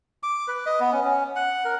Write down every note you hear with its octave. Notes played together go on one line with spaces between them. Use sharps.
D6
B4
D#5
B3
C#4
C#4
F#5
A#4